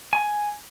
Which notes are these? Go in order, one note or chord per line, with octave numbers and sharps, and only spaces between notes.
G#5